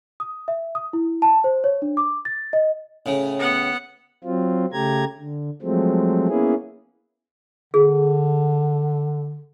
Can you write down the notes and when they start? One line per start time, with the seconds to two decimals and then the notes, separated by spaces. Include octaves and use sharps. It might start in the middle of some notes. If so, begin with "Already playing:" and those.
0.20 D#6
0.48 E5
0.75 D#6
0.93 E4
1.22 A5
1.44 C5
1.64 C#5
1.82 D4
1.97 D6
2.25 A6
2.53 D#5
3.06 A2 C#3
3.40 B3 F#5
4.24 F#3 C4 F4
4.72 C#3 A3 G4 A#5 G#6
5.18 D3
5.62 F3 F#3 G#3 A3 C4
6.28 A#3 B3 C#4 E4 G#4
7.74 D3 G#4